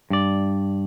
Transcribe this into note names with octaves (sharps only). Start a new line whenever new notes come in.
G2 D5